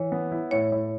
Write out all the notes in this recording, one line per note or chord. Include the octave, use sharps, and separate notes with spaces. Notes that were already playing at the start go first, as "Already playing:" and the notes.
Already playing: E3 C#5
B3
E4
A2 C#5
A2